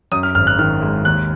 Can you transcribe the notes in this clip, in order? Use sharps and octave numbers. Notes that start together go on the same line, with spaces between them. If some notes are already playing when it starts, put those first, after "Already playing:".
F#2 D#6
F6
G#1 F6
F#6
D#3 F6
G#3
D#2 F#6